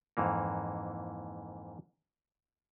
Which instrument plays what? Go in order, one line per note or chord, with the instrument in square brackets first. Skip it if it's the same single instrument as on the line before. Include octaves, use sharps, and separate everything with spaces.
[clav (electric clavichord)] F2 G#2 E3 A#3